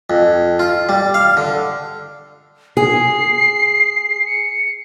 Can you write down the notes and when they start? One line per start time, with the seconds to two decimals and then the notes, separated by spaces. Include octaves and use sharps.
0.10 F2
0.59 F4
0.89 G3
1.14 F5
1.37 D3
2.77 G#4 C7
4.26 C#7